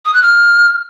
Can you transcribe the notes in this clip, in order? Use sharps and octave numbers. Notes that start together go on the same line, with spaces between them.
D#6
F#6
F6